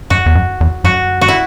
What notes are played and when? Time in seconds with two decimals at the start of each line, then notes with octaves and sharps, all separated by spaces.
0.10 F#2 F#4
0.26 E2
0.35 F#2
0.61 E2
0.84 F#2 F#4
1.21 F#4
1.28 E4